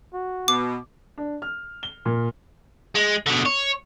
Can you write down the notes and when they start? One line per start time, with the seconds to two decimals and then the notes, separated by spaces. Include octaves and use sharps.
0.14 F#4
0.48 B2 D6
1.18 D4
1.42 F6
1.83 G7
2.05 A#2
2.95 G#3
3.27 B2 D3
3.46 C#5